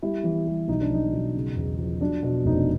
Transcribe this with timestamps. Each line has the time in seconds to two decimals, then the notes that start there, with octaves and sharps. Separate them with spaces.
0.02 G3 E4
0.24 E3
0.47 G3
0.68 B1 D#4
0.81 D4
0.91 B1 D#4
1.13 B1
1.35 C#3
1.56 E2
1.78 F3
2.01 F#3 D4
2.23 B2
2.45 F1 D#4
2.57 D4